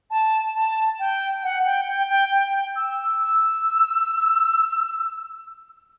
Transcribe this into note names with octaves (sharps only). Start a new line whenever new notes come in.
A5
A5
G5
F#5
G5
G5
G5
G5
E6
E6